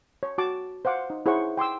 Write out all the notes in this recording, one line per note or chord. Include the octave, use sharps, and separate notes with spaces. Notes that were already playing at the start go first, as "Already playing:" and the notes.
C#5
F#4 A5 D6
C5 F5 F#5 D6
D#4
E4 G#4 C5 C#5 F#5 C#6
G5 C6 D6 E6